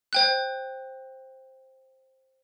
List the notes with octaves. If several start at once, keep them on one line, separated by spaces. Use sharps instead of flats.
C5 G5 F#6